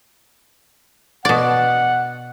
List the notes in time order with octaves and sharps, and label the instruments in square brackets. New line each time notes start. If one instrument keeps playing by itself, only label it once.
[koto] B2 D5 [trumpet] F#5